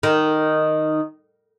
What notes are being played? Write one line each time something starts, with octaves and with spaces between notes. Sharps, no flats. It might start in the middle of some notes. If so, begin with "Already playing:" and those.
D#3